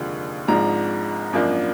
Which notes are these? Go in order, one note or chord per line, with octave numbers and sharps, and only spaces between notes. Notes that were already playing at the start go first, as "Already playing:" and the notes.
Already playing: F1 D#2 D3 F3 G#3
G#1 G#2 F3 G#3 D4 A#5
G#1 F#2 F3 A#3 D4